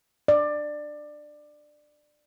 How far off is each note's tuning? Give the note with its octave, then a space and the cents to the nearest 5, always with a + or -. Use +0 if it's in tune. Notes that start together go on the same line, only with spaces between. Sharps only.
D5 +20